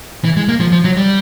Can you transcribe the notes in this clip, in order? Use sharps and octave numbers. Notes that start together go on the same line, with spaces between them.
E3
G#3
A#3
F3
F3
F#3
G3